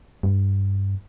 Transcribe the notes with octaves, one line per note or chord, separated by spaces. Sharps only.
G2